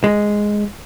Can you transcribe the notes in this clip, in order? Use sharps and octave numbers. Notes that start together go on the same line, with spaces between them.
G#3